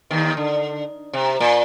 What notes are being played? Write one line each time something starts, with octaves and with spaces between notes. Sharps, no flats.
D#2 D#3
D3
C3
A#2